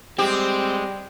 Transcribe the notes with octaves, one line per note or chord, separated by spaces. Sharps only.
G3 G#3 C4 G4